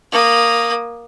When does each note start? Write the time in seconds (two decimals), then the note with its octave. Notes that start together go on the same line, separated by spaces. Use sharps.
0.12 A#3 D#6